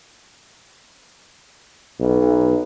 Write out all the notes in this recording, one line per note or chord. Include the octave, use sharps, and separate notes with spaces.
B1